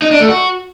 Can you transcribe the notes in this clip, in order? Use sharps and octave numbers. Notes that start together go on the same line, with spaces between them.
D#4
D4
A3
F#4